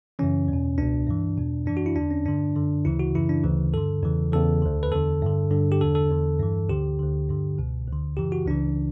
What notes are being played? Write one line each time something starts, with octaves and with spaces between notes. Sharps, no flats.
F#2 C#3 E3 C#4
E2 B2
C#2 B2 D4
G2 E3
E2 B2
F#2 E3 D4
F#4
E4
E2 D3 D4
C#4
G2 D3 D4
F#2 D3
D2 C#3 E3 E4
F#4
F#2 C#3 E3 E4
D4
D2 C#3 E3
G2 D3 A4
E2 C#3 E3
E2 C#3 E3 A4
D2 D3
B4
E2 D3 A4
G2 D3
G2 D3
G4
E2 D3 A4
A4
E2 D3
G2 E3
D2 D3 G4
D2 D3
G2 D3
C#2 B2
D2 D3
F#2 C#3 E3 G4
F#4
C#2 C#3 E3 D4